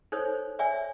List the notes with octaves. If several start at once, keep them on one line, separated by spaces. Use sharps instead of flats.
D#4 A4 C5 C#5
C#5 D5 E5 G#5